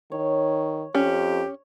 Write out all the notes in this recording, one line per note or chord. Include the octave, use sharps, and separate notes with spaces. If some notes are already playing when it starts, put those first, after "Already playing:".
D#3 C#5
F2 C#4 G4